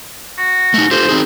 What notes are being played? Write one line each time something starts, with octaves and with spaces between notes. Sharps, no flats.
F#4
A3 D#4
F4 G4 A4 C5
C4 D#4 G#4